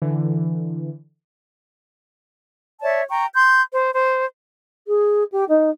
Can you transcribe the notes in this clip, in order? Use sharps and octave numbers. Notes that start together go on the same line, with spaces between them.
D3 E3
C#5 D5 E5 A5
G5 A#5 C#6
C6 G6
C5
C5
G#4
G4
D#4